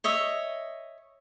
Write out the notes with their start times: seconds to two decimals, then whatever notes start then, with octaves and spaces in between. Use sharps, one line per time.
0.04 C#5 D#5 E5